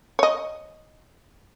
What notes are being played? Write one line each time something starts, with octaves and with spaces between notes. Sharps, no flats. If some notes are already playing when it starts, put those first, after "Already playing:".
C#5 D#5